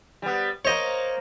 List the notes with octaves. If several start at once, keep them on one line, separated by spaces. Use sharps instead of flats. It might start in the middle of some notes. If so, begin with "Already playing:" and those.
G3 B3
A#3 C5 C#5 D#5